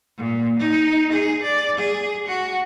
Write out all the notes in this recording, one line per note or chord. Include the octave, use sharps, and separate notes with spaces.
A#2
D#4
G#4
D5
G#4
F#4